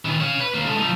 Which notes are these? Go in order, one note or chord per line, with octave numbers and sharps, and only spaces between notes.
D#3 E3
C#5 F5
B4
D#2 A#3
G#3 A4
F3 D#4